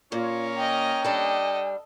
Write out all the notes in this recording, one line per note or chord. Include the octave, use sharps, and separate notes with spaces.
A#2 A#3 C#4 F4 C#5
D#5 G5 A#5
G3 D4 A4 D#5